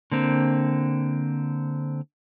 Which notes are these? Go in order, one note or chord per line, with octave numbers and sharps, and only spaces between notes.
D3 A#3 C4